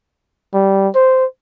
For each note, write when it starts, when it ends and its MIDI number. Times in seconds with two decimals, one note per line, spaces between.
0.54 0.88 55
0.95 1.25 72